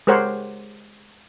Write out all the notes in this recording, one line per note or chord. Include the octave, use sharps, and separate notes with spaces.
G#3 G4 A#4 C5 C#5 F#5